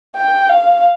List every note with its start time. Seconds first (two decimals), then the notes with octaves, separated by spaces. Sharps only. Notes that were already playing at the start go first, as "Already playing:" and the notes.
0.16 G5
0.49 F5